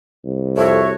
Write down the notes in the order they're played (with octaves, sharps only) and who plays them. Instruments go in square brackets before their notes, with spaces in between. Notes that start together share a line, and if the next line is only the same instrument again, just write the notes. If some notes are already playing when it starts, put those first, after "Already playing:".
[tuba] C2
[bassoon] F2 [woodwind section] A3 F#4 C#5 [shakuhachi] E5